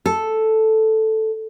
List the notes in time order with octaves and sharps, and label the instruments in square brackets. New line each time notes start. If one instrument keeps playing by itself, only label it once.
[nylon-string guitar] A4